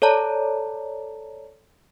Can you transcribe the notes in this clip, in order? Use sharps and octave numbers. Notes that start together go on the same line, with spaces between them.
A4 C#5 D5 A5 A#5